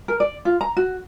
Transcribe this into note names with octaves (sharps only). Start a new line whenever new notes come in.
A#4
D5
F4
A#5
F#4